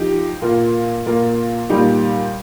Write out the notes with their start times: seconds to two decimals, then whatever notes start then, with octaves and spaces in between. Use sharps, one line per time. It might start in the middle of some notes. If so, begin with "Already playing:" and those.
Already playing: F3 D#4 G4
0.42 A#2 A#3 F4
1.06 A#2 A#3 F4
1.69 A#2 G3 D#4 G4